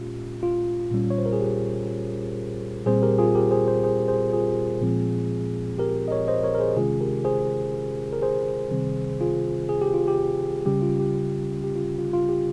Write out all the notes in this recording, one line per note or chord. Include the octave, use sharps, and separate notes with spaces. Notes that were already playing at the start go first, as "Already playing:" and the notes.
Already playing: A#2 G#3 C#4 F4 G4
F4
A#2 G3 C#4
C#5
C5
A#4
G#4
G4
A#2 G3 C4 G#4 C5
G4 A#4
F4 G#4
G4 A#4
G#4 C5
G#4 C5
G#4 C5
G#4 C5
F4 G#4
A#2 F3 G#3 C4
G4 A#4
D#5
A#4 C#5
C5 D#5
A#4 C#5
A#4
G#4 C5
C3 D#3 G#3 C#4 F4 G#4
G4 A#4
G#4 C5
A#4
G#4 C5
C3 D#3 G3 C4
F4 G#4
G#4
G4
F4
G4
C#3 G3 C#4 G4
F4
G4
G4
F4
F4
F4
G4